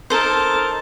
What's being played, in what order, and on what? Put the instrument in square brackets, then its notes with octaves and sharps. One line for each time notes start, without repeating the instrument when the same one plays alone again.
[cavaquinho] D#4 A4 C5 [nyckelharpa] A#4 A5